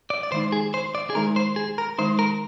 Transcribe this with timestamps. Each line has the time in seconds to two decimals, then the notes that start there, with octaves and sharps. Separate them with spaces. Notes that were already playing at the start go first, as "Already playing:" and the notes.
0.10 D5
0.23 D5
0.32 D#3 G#3 D#4 C5
0.52 G#4
0.74 C5
0.95 D5
1.10 G#4
1.15 D#3 G#3 D#4 A#4
1.36 C5
1.56 G#4
1.78 A#4
1.98 D#3 G#3 D#4 C5
2.19 A#4